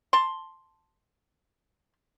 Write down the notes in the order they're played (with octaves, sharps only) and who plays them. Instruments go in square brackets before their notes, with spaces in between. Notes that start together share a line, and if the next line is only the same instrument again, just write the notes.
[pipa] A5 C6